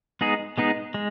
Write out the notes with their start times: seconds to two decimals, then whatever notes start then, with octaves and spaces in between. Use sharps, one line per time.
0.21 G#3 B3 D#4 G#4
0.58 G#3 B3 D#4 G#4
0.94 G#3